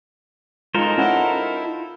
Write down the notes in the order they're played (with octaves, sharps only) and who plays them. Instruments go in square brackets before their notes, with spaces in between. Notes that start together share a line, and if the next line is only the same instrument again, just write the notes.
[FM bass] G#3 [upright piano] D#4 F4 [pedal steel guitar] A4 A#4 C5
[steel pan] C#4 F#5 B5 [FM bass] E4